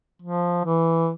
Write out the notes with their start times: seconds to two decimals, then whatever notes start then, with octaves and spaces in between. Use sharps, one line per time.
0.22 F3
0.65 E3